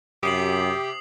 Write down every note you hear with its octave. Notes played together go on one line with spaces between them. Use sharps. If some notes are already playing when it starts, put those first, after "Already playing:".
F#2 C3 G4 D#6 C7 F#7